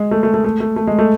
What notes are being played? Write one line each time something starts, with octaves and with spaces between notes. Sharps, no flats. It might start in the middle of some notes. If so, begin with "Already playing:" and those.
Already playing: G#3
A3
A3
A3
A3
A3
A3
G#3
A3